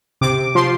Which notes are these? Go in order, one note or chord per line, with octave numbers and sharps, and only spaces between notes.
C3 D6
F3 C6